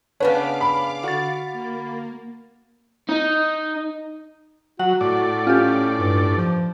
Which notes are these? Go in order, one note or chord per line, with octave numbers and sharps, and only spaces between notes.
C#3 B3 D4 B4 C#5 F5 D6
B5
D3 F#4 A6
A#3
D#4
F#3 F#4 F#5
A2 D5
C#4 F4 G4
G2
F3